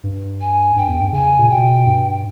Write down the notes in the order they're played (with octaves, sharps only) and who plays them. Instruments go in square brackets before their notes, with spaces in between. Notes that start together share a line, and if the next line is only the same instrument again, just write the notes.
[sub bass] G2
[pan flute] G#5
[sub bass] G2 [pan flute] G5
[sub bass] E2
G2
[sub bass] C#3 [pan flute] G#5
[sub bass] A#2
[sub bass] B2 [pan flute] G5
[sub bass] G2